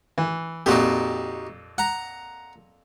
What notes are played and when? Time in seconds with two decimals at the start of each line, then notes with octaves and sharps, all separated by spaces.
0.18 E3
0.66 F2 A#2 D#4 F#4 G4
1.78 F#5 A#5